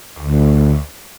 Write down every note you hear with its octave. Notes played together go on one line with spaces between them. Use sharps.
D2